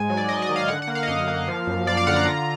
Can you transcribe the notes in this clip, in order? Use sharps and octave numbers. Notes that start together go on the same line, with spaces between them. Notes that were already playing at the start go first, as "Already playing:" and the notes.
Already playing: G#2 G#3 G#5
F#3
D5
F#3 D#5
D#5
D#3
F5
D3 F#5
F#5
A#3
F5
D#5
F#2 F5
A#3
F3
F#2
F3 D5
F5
D3 F#5
A#5
F4